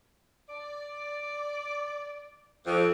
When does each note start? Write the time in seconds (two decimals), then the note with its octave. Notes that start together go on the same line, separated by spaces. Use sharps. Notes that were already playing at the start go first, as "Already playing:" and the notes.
0.49 D5
2.66 F2